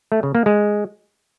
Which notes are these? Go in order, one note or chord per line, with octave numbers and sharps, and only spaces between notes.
A3
C#3
A#3
G#3